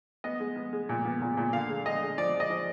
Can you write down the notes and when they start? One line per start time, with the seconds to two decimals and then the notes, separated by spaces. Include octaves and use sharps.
0.24 B3 D#5
0.40 G#3
0.56 B3
0.73 G#3
0.89 A#2
1.05 B3
1.21 A#2
1.37 A#2
1.53 D3 F5
1.70 G#3
1.85 D3 D#5
2.02 G#3
2.18 F3 D5
2.34 F3
2.40 D#5
2.50 F3